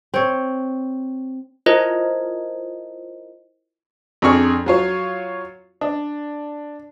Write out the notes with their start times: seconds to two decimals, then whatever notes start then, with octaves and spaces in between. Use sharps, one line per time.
0.14 C4 C#5
1.66 E4 F4 A#4 C5 D#5
4.22 F2 D4 G#4 C#6 F6
4.66 F#3 F4 C#5
5.81 D4